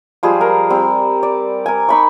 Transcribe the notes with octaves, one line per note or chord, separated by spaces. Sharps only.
F3 G3 G#3 G#4
A#4
G3 C4
D5
A#4 G#5
D#4 B5 C#6